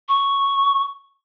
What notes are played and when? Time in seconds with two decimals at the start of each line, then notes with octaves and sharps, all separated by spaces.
0.09 C#6